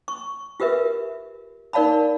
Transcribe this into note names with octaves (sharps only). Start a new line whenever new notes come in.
C#6
F4 G4 A#4 B4 E5
D#4 A#4 D5 F5 A5 B5